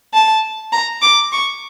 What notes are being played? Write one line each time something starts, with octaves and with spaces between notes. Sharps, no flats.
A5
A#5
D6
C#6